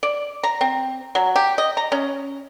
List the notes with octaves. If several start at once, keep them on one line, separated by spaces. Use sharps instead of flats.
D5
A#5
C4
F#3
G4
D#5
A#5
C#4